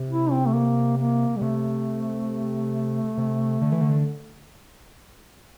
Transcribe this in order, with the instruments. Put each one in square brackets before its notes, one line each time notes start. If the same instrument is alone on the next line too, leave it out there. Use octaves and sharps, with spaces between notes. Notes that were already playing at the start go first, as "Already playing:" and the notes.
Already playing: [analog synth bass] C3
[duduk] E4
C4
A3
A#3
A#3
G3
[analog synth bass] C3 [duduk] A3
[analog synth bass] C3
D3
E3
D3